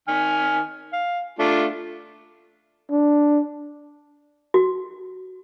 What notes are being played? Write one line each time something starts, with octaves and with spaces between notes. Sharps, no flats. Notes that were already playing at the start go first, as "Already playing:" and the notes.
D#3 G#5 F6
F5
A3 D4 F4
D4
F#4